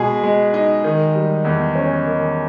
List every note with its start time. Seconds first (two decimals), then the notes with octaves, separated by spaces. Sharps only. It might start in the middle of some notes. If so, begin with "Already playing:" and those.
Already playing: B2 G#3 G#4
0.23 G#3
0.54 D#4
0.84 D#3
1.15 G3
1.45 E2
1.75 C#4
2.06 D#3